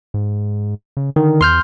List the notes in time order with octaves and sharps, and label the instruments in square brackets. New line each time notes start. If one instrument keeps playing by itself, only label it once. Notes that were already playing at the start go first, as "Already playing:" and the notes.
[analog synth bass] G#2
C#3
[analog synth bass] D3 [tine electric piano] D#3
[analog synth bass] E2 [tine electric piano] C6 F6 G6